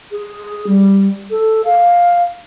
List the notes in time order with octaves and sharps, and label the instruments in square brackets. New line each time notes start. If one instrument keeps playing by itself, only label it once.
[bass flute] G#4
G3
A4
F5